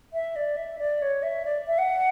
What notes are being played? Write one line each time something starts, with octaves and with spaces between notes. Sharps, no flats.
E5
D5
E5
D5
C#5
E5
D5
E5
F#5